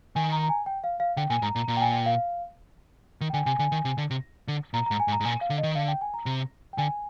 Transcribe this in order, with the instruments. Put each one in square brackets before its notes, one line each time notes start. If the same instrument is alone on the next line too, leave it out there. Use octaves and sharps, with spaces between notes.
[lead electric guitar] D#3 [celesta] G#5
[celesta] A#5
A#5
G#5
G5
F5
F5
[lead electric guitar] D3 [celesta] G5
[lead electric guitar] A#2 [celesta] G#5
[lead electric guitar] G#2 [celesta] A#5
[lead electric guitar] A#2 [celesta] A#5
[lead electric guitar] A#2 [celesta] A#5
[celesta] G5
G#5
G5
F5
[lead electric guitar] D#3
[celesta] G5
[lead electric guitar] D3 [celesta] G#5
[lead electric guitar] C3 [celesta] G#5
[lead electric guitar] D3 [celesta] G#5
[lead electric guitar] D#3
C3
D3
C3
D3
[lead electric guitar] A#2 [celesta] A#5
[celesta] A#5
[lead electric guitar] G#2
[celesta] G#5
[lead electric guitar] G#2
[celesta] A#5
[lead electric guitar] G#2
[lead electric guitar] A#2 [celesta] G#5
[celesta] F5
[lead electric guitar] D3
[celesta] D#5
[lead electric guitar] D#3
[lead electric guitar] D3 [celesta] F5
[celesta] G5
G#5
A#5
[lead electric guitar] C3
[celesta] G5
[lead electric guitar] D3 [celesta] G#5